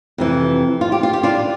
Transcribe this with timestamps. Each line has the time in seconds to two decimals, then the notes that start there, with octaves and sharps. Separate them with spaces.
0.18 F2 C3 E3
0.81 F4
0.92 G4
1.03 F4
1.13 G4
1.23 D4 F4